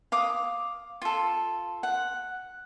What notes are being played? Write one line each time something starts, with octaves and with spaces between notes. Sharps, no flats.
F5 D6 D#6
F4 A4
F#5